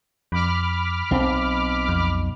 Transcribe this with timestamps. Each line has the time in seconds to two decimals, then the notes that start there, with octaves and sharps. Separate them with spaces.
0.32 F2 B5 D6 F6
1.11 B1 C4
1.89 F2